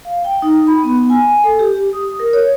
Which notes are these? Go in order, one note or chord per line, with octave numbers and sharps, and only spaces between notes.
F5
G5
D#4
B5
B3
G#5
A4
G4
D#6
A#4
C#5